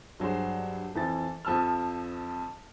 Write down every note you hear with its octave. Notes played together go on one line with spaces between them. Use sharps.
G2 F#3 G#4 C5
F2 E3 A6
F2 F3 A5 E6 F6